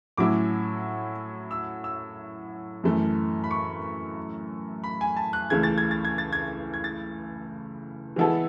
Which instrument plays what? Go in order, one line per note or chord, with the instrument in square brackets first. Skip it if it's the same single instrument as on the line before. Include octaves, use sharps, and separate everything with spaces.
[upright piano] A2 F#3 C#4 E4 [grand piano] D6
[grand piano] E6
E6
[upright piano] F#2 E3 A3
[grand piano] B5
C#6
B5
G#5
A5
F#6
[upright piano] C#2 C#3 E3 A3 [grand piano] G#6
[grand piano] A6
G#6
A6
G#6
A6
G#6
G#6
A6
[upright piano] E3 G#3 B3 E4 A4